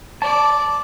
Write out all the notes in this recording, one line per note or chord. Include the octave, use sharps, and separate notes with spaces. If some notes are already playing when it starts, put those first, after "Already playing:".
D5 A5